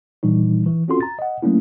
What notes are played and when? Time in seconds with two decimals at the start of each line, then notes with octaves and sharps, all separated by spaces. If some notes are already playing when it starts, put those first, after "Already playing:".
0.23 A#2 D#3 E3 G3 D4 D#4
0.66 E3
0.88 C4 C#4 F4 F#4 A4 C6
1.01 A#5 A6
1.19 D#5 F#5
1.42 F#3 A3 A#3 C#4 D4 E4